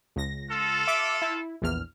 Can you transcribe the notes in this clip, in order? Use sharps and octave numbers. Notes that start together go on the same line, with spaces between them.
C#2 A#6
F4 A4
E5 D6
E4
A#1 E2 F6